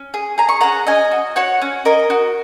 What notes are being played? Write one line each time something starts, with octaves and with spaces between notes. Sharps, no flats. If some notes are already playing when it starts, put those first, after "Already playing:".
Already playing: C#4
G#4
G#4 A#5
C#6
C#4 F#5 A#5
C#4 D#5 G#5
F#4
F#4 C#5 F#5
C#4
C#4 A#4 D#5
F#4